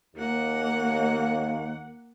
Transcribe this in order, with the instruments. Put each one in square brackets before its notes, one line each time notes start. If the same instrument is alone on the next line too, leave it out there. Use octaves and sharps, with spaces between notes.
[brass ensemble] D#2 [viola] A#3 F#5